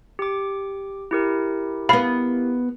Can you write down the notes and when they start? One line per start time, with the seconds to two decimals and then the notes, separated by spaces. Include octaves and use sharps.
0.19 G4 D6
1.11 E4 G4 A#4
1.89 B3 F5 B5